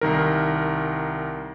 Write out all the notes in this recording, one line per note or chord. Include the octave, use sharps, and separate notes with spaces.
C2 D#3 A#4